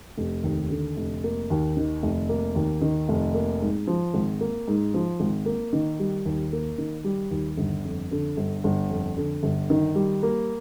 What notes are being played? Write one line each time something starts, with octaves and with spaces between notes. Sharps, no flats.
F1
D#2
D3
F1
A#3
D#2
D#3
F1
A#3
D#2
D#3
F1
A#3
G#2
F3
G#1
A#3
G#2
F3
G#1
A#3
D#3
G3
D#2
A#3
D#3
G3
D#2
G1
F2
D3
G1
G1
F2
D3
G1
D#3
G3
A#3